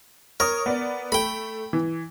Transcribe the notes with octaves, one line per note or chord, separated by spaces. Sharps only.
A#4 C#5 D#6
B3 D5
A3 G5 B5
E3